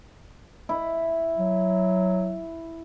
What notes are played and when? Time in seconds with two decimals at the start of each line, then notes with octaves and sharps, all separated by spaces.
0.69 E4
1.38 F#3